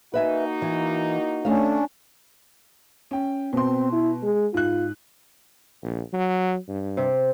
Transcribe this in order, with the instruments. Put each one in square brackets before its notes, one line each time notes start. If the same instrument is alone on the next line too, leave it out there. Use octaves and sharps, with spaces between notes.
[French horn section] A#3 D#4 F#4 [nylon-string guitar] B4 E5 G#5
[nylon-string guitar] E3
[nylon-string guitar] A3 F5 [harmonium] C#4 D4
[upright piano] C#4 G5
[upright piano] B2 C6 [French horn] C4
[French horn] E4
G#3
[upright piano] G#2 F#6 [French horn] F4
[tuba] A#1
F#3
G2
[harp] C3